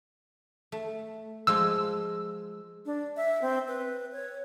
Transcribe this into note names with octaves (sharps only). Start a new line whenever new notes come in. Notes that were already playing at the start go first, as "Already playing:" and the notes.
A3
F3 G#3 F4 E6
D4
E5
C4
B4
C#5